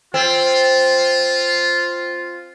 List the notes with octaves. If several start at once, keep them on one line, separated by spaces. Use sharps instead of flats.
C4 F4